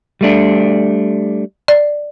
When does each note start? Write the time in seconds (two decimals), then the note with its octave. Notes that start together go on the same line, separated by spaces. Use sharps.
0.21 G3 A3 D4
1.68 D5